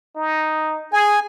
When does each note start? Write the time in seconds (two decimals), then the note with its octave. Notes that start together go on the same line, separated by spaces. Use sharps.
0.16 D#4
0.93 G#4 G#5